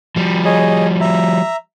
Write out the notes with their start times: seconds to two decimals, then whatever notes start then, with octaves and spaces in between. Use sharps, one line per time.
0.16 F3 G3
0.45 G#4 C#5 D#5
1.01 E5 A#5